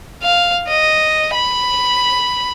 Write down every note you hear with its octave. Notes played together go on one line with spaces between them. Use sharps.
F5
D#5
B5